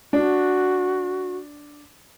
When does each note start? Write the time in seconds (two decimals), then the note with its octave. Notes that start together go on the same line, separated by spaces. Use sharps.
0.13 D4 F#4